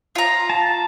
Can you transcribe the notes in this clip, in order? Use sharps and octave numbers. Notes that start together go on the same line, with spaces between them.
F4 A#5
A5